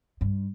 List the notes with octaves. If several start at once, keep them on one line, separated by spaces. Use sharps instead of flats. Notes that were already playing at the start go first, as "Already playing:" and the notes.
G2